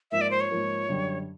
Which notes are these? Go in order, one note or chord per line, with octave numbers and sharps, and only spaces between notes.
G#2 F3 A#3 E5
D5
C5
C#5
G#2 F3 A#3
F#2 D3 G3